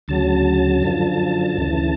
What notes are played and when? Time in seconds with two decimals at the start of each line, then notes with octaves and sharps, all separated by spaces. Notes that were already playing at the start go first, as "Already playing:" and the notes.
0.08 D2 C#3 F#3 A5
0.83 F#2 D3 F3
1.58 D2 C#3 E3